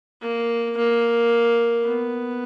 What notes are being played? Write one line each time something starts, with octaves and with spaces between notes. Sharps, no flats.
A#3
A#3
B3